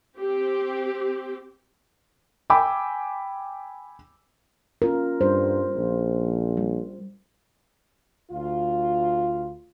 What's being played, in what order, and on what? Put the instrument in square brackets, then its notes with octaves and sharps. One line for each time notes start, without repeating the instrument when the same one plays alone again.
[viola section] C4 G4
[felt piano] G5 G#5 B5 D6 E6
[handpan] C#4 F4 A#4
[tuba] G2 [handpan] C5
[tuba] A#1
[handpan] G3
[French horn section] D2 F4